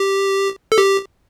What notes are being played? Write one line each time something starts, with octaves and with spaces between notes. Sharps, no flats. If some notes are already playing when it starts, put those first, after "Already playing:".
Already playing: G4
A4
G4